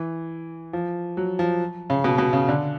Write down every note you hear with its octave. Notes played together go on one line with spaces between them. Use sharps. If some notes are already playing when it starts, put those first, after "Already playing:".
Already playing: E3
F3
F#3
F3
C#3
B2
B2
C#3
D3